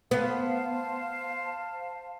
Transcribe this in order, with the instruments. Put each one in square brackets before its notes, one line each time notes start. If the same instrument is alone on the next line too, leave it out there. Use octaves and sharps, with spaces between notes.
[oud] B3 [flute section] C5 F5 A5